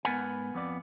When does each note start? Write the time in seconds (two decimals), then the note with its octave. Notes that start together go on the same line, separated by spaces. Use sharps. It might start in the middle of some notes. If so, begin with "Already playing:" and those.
0.05 G#2 B3 A#4 B4 F#5 G#5
0.54 F2 B3 D5